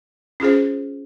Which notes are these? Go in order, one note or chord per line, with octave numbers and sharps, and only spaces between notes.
C#4 F4 G#4 C5